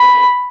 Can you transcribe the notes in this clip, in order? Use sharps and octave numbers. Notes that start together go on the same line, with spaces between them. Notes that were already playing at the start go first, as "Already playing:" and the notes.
Already playing: B5